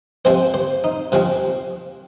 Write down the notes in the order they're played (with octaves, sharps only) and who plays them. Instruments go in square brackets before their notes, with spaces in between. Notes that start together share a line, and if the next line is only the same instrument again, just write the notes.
[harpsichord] C3 F3 G#3 C4 C5
C5
D#4
C3 F3 G#3 C4 F4